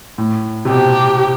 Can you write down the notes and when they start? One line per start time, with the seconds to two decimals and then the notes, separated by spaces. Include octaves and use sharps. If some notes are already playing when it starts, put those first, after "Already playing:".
0.18 A2
0.65 C3
0.69 B2 G4